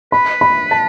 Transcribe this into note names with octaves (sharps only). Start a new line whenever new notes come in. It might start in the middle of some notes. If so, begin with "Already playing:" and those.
B4 B5
B5
A5